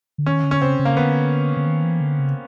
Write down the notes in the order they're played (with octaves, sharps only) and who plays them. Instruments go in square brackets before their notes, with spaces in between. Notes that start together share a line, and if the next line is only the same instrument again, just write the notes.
[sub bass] D3
[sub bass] D#3 [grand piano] C#4
[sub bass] D3
[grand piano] C#4
[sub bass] C#3 [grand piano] C4
[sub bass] C#3
[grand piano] A#3
[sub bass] D3 [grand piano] B3
[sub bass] D3
D#3
E3
D3
C#3